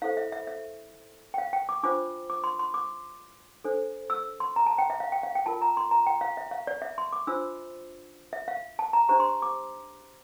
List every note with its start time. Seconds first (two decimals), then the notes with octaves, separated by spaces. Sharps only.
0.02 E4 A4 C5 F5
0.17 E5
0.32 E5
0.47 E5
1.34 G5
1.38 F5
1.53 G5
1.69 D6
1.83 D4 F4 C5 D6
2.30 D6
2.44 C6
2.59 C6
2.74 D6
3.64 D4 A4 C5
4.10 E6
4.40 C6
4.56 A#5
4.66 A5
4.78 G5
4.90 E5
5.00 F5
5.12 G5
5.23 F5
5.35 G5
5.46 F4 A#4 A5
5.62 A#5
5.77 C6
5.91 A#5
6.06 G5
6.21 F5
6.37 E5
6.51 F5
6.67 D5
6.82 E5
6.98 C6
7.13 D6
7.27 D4 F4 C5 E6
8.33 E5
8.48 F5
8.79 A5
8.93 A#5
9.09 D4 G4 C5 A#5
9.20 C6
9.42 D6